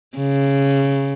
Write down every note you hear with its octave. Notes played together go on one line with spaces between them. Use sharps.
C#3